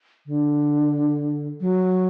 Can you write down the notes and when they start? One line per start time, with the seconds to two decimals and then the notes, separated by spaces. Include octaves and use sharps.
0.26 D3
1.61 F#3